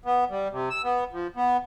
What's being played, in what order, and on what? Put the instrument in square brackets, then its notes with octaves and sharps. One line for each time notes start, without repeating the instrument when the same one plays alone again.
[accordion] B3
G3
C3
E6
B3
F3
B3